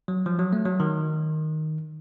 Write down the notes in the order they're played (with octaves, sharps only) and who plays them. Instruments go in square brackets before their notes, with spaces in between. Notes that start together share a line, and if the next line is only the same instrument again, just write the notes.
[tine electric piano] F#3
F3
F#3
A3
F#3
D#3